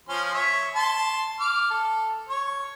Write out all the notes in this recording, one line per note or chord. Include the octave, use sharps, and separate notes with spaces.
F3 C#4 C6
C#5 E5
A5 C6
D6 F6
A4
C#5